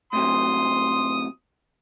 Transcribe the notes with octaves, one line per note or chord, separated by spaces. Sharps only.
A2 C3 F#3 C6 D#6